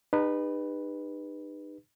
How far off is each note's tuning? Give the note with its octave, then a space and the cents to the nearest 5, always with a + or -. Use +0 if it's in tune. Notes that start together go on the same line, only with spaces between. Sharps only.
D#4 -35 G4 +40 B4 -5